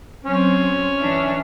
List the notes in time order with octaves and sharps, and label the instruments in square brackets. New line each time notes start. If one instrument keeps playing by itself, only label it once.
[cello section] F#3 C4 [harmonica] C#4
[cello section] E3 D4 E5